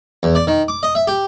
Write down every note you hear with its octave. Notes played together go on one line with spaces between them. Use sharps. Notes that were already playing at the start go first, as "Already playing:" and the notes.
E2
D5
D#3
D6
D#5
E5
G4